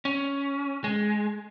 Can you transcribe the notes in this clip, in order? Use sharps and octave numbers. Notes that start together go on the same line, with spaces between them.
C#4
G#3